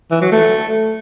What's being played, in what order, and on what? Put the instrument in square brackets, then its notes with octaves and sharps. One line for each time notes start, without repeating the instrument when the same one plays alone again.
[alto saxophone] E3
F#3
A3